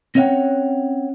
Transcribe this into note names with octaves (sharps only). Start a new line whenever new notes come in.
C4 C#4 C#5 E5 F#5 G5